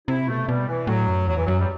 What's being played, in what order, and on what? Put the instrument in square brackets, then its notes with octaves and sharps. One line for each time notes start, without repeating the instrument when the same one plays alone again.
[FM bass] C3 [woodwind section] E4
[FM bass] B2 [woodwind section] A3
[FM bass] B2 [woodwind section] G3
[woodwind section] E3
[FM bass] A2 [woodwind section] F#3
[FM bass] F#2
[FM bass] E2 [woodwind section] F#3
[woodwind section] E3
[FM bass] F#2 [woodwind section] F#3
[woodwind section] G3